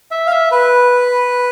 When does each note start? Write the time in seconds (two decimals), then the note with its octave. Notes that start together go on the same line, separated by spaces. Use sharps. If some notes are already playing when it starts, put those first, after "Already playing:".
0.11 E5
0.27 F5
0.31 E5
0.51 B4